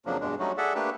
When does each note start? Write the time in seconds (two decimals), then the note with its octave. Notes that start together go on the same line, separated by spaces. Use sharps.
0.06 F2 C#3 F3 F#3 A#3 D4
0.21 E2 G2 B2 G#3 D4
0.39 F#3 G3 A3 C#4 D#4 F#4
0.58 G#4 A4 D5 E5 F#5
0.75 A3 A#3 D4 G4 B4